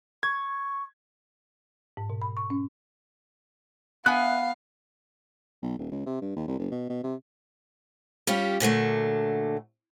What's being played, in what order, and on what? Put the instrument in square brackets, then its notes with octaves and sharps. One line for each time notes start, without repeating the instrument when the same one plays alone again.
[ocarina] C#6 [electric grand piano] G#6
[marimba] G#2
B2
B5
C#6
C#4
[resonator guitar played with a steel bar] B3 G#5 [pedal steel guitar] E5 F#6 [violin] F5
[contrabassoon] B1
D#1
C#2
C3
G2
D#2
C2
F#1
B2
B2
C3
[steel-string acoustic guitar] G3 C#4 F4 G4
A#2 D3 F#3 A3